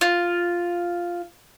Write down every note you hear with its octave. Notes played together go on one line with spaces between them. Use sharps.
F4